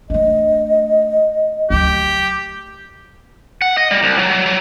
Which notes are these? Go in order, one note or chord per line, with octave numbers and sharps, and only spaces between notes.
A3 D4 D#5
D2 F#3 G4
F#5
D#5
G3
C2
F#3
F#3
F#3